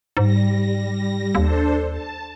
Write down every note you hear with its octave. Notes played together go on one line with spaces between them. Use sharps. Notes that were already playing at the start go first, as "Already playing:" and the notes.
G#2 G3 A#6
D#2 D4 A4 C5
A5